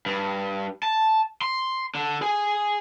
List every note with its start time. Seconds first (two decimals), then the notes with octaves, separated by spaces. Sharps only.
0.06 G2
0.83 A5
1.42 C6
1.95 D3
2.22 G#4